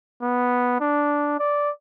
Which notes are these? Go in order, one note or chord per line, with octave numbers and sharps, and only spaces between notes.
B3
D4
D5